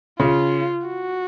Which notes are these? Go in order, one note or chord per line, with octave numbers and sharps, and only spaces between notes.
C#3 F4
F#4